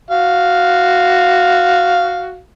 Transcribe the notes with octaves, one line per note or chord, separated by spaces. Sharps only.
F#4 F5